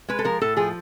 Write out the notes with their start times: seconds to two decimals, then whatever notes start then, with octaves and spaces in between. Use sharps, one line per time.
0.08 G#3 B4
0.19 A4
0.25 F3 A#4
0.41 A2 A4
0.57 F3 G#4